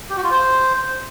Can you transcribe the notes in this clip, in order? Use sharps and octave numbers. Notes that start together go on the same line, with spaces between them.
G4
F#4
F4
C5